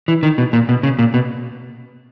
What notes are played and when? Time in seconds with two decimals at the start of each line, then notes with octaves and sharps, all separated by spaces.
0.08 E3
0.23 D#3
0.38 B2
0.53 A#2
0.69 B2
0.83 C#3
0.99 A#2
1.14 B2